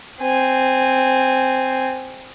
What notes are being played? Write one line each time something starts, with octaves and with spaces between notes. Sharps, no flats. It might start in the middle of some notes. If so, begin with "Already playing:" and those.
C4 G#5